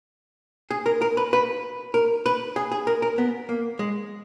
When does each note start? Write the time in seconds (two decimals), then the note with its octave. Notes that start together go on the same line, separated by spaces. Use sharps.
0.71 G#4
0.86 A#4
1.02 A#4
1.17 B4
1.33 B4
1.94 A#4
2.26 B4
2.56 G#4
2.72 G#4
2.87 A#4
3.02 A#4
3.18 B3
3.49 A#3
3.79 G#3